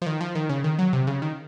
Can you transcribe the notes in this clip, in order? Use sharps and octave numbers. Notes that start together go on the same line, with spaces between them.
F3
D#3
F3
D#3
C#3
D#3
F#3
C3
C#3
D#3